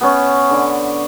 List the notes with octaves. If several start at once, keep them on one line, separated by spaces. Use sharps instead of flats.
B3 C#4
D3